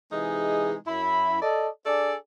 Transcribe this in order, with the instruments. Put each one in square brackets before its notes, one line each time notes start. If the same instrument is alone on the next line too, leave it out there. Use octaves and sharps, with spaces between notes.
[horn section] C3 E3 G#3 D#4 G#4
F#2 E4 B5
A4 D5 D#5
D4 G#4 A4 D5